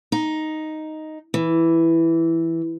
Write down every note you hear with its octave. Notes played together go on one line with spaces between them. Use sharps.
D#4
E3